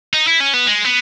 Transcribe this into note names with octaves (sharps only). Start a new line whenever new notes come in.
D#4
E4
C#4
B3
G#3
B3